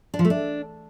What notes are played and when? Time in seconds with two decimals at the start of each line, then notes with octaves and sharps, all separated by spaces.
0.14 D4
0.19 F3
0.25 A3
0.30 D4